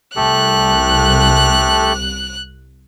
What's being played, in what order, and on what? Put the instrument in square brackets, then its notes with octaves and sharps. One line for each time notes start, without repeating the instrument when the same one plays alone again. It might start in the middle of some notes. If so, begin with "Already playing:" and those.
[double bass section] C2 [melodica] A3 G4 A4 [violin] F#6